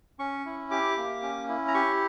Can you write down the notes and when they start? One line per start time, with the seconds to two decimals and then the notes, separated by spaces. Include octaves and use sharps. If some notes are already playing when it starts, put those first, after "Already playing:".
0.19 C#4 C#6
0.45 E4
0.71 G4 D6
0.97 A#3
1.22 C#4
1.48 E4
1.68 A#5
1.74 G4 C#6